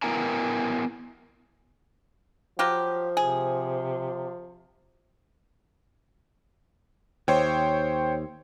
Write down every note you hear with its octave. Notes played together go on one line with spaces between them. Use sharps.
B3 E4 A#4 G5 G#5 A#5
F3 F#3 F4 G4
C3 G#4
D#2 C5 C#5 G5